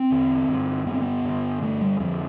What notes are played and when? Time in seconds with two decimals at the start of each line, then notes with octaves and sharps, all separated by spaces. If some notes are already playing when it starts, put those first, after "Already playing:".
Already playing: C4
0.10 E2 D3
0.48 G2 D3
0.86 G2 D3 B3
0.94 C4
1.02 B3
1.25 G2 D3
1.62 G2 D3 A3
1.81 G3
2.00 F2 D3 F3